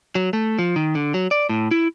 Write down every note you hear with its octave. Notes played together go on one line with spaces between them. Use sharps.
F#3
A3
F3
D#3
D3
F#3
D5
A2
E4